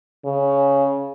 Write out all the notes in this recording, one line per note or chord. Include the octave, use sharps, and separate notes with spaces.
C#3